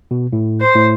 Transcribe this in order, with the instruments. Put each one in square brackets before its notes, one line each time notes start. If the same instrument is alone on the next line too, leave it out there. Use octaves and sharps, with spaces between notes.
[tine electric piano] B2
A2
[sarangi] C5
[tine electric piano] A2